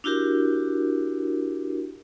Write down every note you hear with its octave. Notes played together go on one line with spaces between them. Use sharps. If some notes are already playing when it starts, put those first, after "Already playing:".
D4 E4 F#4 G4 A#4